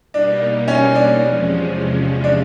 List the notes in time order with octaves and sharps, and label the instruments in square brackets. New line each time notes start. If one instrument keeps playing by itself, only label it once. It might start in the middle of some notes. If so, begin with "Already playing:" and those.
[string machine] B2 G3 A#3 D#4 [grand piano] D4
[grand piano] C#4
D4
[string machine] E2 C3 F3 G#3 C#4
[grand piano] D4